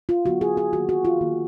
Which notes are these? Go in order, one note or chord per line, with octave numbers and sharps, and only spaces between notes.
F4
D3 F#3 B3 F#4
G#4
G#4
D#3 A#3 F#4
F#4
F4
D#3 A#3